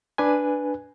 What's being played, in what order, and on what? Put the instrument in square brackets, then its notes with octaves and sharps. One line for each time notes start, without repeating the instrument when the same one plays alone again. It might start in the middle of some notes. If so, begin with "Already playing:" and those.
[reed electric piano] D4 B4 G#5